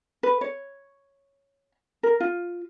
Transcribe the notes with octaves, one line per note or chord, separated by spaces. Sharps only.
B4
C#5
A#4
F4